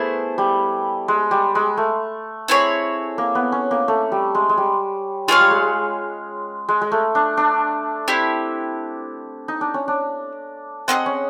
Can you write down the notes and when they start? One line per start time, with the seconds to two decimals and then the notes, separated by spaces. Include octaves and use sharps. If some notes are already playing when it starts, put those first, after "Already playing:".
Already playing: A3 B3 E4 G#4 C5
0.38 G3
1.08 G#3
1.31 G3
1.55 G#3
1.77 A3
2.48 C4 E4 G#4 C#5
3.18 A#3
3.35 B3
3.52 C#4
3.71 A#3
3.88 A3
4.12 G3
4.35 G#3
4.49 G#3
4.57 G3
5.28 G#3 F4 G#4 C#5 F5
5.40 G3
5.51 G#3
6.69 G#3
6.81 G#3
6.92 A3
7.15 D4
7.37 D4
8.08 C4 E4 G4
9.48 D#4
9.61 D4
9.74 C#4
9.88 D4
10.88 C4 G#4 B4 D#5 F#5
11.06 C#4